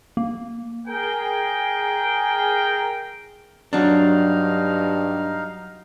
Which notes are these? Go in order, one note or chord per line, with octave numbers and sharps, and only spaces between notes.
A#3
G#4 A#4 G5
G2 F#3 D4 D#4 F5